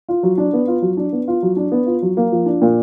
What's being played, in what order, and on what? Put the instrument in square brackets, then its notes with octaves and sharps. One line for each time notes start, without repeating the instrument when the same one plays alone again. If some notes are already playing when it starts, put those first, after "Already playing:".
[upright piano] F4
F#3
D4
B3
F4
F#3
D4
B3
F4
F#3
D4
B3
F4
F#3
A#3
F3
D4
A#2